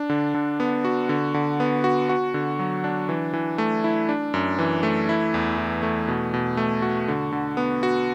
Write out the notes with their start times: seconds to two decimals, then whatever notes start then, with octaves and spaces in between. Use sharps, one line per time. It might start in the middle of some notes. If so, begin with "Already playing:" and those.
Already playing: D4
0.10 D3
0.34 D3
0.60 B3
0.85 F#4
1.09 D3
1.34 D3
1.60 B3
1.84 F#4
2.09 F#4
2.34 D3
2.59 F#3
2.84 D4
3.09 E3
3.33 E3
3.58 A3
3.84 E4
4.09 D4
4.34 F#2
4.59 E3
4.83 A3
5.09 E4
5.34 E2
5.58 E3
5.83 A3
6.08 B2
6.34 B2
6.57 A3
6.82 F#4
7.08 D3
7.32 D3
7.57 B3
7.83 F#4